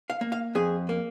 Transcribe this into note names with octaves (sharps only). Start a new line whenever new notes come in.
F5
A#3
F5
F2 G#4
A#3